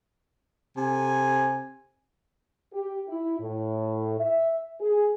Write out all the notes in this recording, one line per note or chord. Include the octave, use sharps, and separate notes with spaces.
C3 A4 G#5
G4
E4
A2
E5
G#4